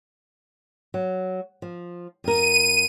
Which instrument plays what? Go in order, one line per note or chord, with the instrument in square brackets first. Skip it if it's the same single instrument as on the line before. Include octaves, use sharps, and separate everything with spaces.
[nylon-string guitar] F#3
F3
[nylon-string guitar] F2 A#4 [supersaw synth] D#7